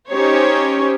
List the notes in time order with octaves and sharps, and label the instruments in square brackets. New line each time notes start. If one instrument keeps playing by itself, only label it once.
[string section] C#4 D#4 G4 C5 C#5